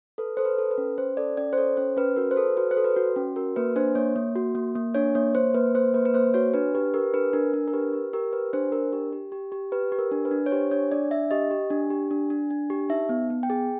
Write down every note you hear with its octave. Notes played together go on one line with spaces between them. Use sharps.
A4 B4
A4 C5
B4
A4
B4
C#4
C#4 C5
A4 D5
C#4 D5
C5
A4 C#5
C#4 C5
C#4 B4
F#4 A#4
C5
A4 B4
F#4 B4
C5
A4
B4
F#4
C#4
F#4 A#4
A#3 B4
D4 C5
A#3 C#5
A#3
F#4
A#3
A#3
D4 C#5
A#3 C#5
A#3 C5
A#3 B4
A#3 C5
A#3 B4
B4
A#3 C5
F#4 C#5
D4 B4
G4 B4
G4 A#4
D4 B4
D4 A#4
D4
A#4
G4 B4
G4
G4 A#4
G4 B4
D4 C5
D4 A#4
G4
G4
G4
G4
G4 B4
G4
A#4
D4
B4
D4
C#5
G4 C5
D4 C#5
D4 D5
D4 E5
G4 D#5
G4
D4
G4
D4
D4
D4
G4
D#4 E5
B3
B3
G5
G#4